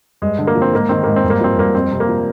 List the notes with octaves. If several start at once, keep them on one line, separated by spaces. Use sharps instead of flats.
G2 G#3
D3
A#3
F3
C4
G#2 A#3
D#3 C4
G#2 A#3
C4
G2
A#3
F3 C4
G2 A#3
F2 C4
C3
A#3
F3